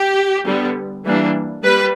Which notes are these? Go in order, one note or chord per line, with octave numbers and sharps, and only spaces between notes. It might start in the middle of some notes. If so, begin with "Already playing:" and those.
Already playing: G4
D3 G3 B3
E3 G3 A#3 D4
G3 A#3 B4